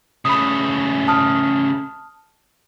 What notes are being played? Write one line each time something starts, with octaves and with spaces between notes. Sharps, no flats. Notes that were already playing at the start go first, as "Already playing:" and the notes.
C#3 A3 B5 D#6
A5 D#6 F6